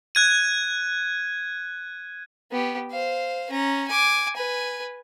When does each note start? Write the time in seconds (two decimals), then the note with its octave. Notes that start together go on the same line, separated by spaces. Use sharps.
0.15 F#6 G#6 D#7
2.52 B3 G4
2.91 C5 F5
3.50 C#4 A#5
3.87 G#5 D6
4.36 B4 G#5